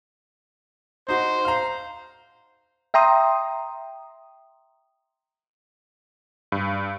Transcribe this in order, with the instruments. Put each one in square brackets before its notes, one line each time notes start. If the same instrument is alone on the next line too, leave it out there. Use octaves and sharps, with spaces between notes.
[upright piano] D#4 F#4 [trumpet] C5
[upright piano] F5 A#5
[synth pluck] E5 G5 A#5 C6 D#6
[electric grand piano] G2